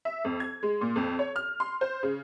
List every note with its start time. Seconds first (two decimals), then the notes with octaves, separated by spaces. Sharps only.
0.05 E5
0.25 F2
0.40 G#6
0.63 G#3
0.81 A#2
0.96 F2
1.19 C#5
1.36 F6
1.60 C6
1.81 C5
2.03 C#3